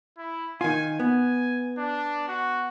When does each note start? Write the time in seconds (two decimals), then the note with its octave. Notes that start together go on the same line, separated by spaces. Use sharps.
0.18 E4
0.61 D#3 F4 G#5
1.00 B3 G#5
1.78 D4
2.28 F#4